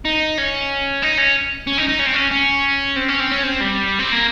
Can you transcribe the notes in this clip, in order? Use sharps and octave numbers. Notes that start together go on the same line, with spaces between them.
D#4
C#4
D#4
C#4
C#4
D#4
D#4
C#4
C4
C#4
C#4
C4
C#4
C4
C#4
C4
G3
C4
A#3